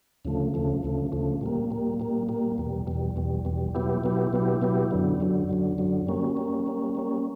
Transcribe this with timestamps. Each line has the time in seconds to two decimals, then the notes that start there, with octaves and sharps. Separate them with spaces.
0.25 D2 C#3 F3 A3
0.54 D2 C#3 F3 A3
0.83 D2 C#3 F3 A3
1.12 D2 C#3 F3 A3
1.41 A#2 G3 A#3
1.71 A#2 G3 A#3
2.00 A#2 G3 A#3
2.29 A#2 G3 A#3
2.58 E2 B2 G3
2.87 E2 B2 G3
3.16 E2 B2 G3
3.45 E2 B2 G3
3.74 B2 F#3 B3 E4 G4
4.04 B2 F#3 B3 E4 G4
4.33 B2 F#3 B3 E4 G4
4.62 B2 F#3 B3 E4 G4
4.91 F#2 D3 F#3
5.20 F#2 D3 F#3
5.49 F#2 D3 F#3
5.78 F#2 D3 F#3
6.07 G3 A#3 C#4
6.37 G3 A#3 C#4
6.66 G3 A#3 C#4
6.95 G3 A#3 C#4